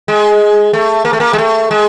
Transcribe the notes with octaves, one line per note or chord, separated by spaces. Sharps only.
G#3
A3
A#3
A3
A#3
G#3
A3
G#3